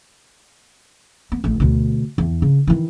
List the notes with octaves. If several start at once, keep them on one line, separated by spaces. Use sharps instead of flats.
B3
A1 A3
D2 B2
E2
C#3
D#3 E3